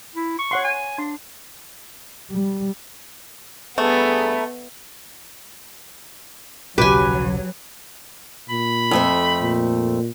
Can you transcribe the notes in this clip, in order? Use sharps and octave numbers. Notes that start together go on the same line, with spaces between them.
E4
C#6
C#5 F#5 C6
G#5
D4 C6
G3
G2 A3 B3 G#4 A4 A#5 B5
D#1 B1 C#3 F#3 G4 B4 G#5
A#2 B5
F2 A3 C5
A#2